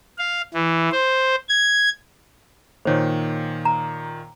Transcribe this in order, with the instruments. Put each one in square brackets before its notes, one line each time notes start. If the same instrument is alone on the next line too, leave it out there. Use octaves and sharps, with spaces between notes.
[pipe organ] F5
E3
C5
G#6
[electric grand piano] A#2 D#3 A#3 [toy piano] C5 C#5
[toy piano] A#5